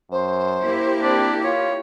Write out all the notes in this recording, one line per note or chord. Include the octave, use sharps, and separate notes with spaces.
F#2 C5
A#3 E4 G4
C4 D4
F4 C#5